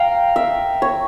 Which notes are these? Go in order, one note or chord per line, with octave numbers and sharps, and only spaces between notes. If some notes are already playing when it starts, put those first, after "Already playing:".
Already playing: F5 G5 A#5
E5
C#5